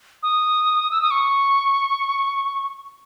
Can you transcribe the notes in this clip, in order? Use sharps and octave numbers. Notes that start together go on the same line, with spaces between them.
D#6
E6
D#6
C#6